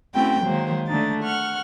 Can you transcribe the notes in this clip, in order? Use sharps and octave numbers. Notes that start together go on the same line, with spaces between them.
A3 C4 C#4 E4 F#4 G5
D#3 F#3 G#3 A#3 C5
D3 A3 D4 D#4 A6
F#5 C#6 F6